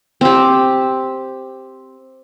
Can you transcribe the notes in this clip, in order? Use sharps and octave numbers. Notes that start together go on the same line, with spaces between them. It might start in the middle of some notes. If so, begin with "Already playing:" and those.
C4 G4